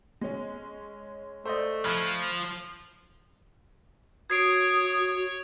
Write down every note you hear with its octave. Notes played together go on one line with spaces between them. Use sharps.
G#3 C#4
A3 C5 D5 D#5
F3 B5 F6 F#6 G#6 C7 D7
F#4 C#5 D#6 G#6 C7 D7